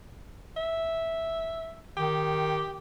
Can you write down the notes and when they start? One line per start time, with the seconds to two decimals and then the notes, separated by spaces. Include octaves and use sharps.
0.57 E5
1.97 D#3 G4